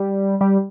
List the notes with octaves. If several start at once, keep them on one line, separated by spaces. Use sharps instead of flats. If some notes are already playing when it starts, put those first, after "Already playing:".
Already playing: G3
G3